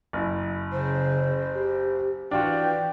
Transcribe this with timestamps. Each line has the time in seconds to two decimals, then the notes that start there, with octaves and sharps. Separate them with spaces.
0.13 F#1 E4
0.72 C#3 C5
1.54 G4
2.31 E3 D4 F4 F#4 G5